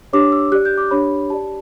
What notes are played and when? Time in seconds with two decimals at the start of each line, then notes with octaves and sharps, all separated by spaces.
0.13 D4 G4 C#5 D6
0.32 E6
0.52 G4 D5 F#6
0.65 G6
0.77 D6
0.91 D4 G4 C#5 B5
1.30 G4 D5 A5